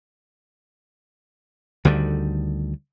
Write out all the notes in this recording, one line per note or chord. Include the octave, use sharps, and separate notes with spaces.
D2 D3 D#3 G3